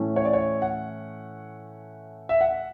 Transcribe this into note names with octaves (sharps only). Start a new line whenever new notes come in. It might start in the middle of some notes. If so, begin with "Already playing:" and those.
Already playing: A2 E3 A3 C#4
C#5
D5
C#5
F#5
E5
F#5